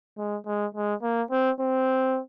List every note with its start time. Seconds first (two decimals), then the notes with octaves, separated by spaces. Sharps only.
0.17 G#3
0.46 G#3
0.75 G#3
1.03 A#3
1.31 C4
1.60 C4